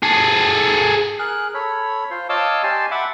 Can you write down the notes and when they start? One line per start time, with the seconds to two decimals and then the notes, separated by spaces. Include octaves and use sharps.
0.03 G#4 A4
1.19 G#4 A#4 F#6
1.54 A4 C#5 B5
2.10 F4 C5 C6
2.29 C#5 D#5 F5 A5 D6 E6
2.63 G4 D5 G#5 A5 C6
2.91 E5 F#5 B5 D6